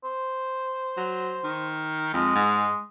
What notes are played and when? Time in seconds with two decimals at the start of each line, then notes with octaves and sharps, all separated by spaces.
0.04 C5
0.97 F#3
1.44 D#3
2.14 F2 G#3
2.35 G#2